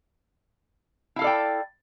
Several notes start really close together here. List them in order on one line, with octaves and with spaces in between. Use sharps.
E4 F5 A4 D5 G5